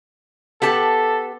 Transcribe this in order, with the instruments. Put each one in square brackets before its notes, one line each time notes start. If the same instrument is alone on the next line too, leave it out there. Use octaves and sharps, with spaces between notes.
[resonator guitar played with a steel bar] B3 G4 A5 [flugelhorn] A4